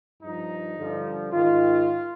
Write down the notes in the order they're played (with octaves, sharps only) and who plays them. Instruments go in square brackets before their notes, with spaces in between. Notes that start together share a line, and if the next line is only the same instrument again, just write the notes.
[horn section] G2 F3 D#4
G2 D3 F3
G#2 D#3 F4